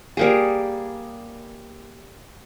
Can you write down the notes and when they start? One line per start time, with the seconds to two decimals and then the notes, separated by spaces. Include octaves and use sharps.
0.17 G3 A#3 G#4